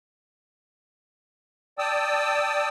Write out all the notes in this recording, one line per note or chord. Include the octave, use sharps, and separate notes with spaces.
D5 G5 A5 D#6 E6